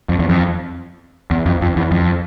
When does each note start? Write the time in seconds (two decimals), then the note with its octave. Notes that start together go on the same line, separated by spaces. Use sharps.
0.09 F2
0.19 E2
0.29 F2
1.31 E2
1.46 F2
1.61 F2
1.76 E2
1.91 F2